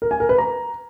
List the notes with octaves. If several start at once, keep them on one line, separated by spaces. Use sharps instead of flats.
A#4
G#5
A#4
B4
A#5